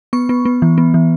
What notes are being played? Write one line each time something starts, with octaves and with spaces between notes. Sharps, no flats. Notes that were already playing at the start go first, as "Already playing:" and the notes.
B3 C#6
B3
B3
E3
B3
E3